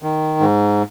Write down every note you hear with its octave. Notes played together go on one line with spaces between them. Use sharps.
D#3
G#2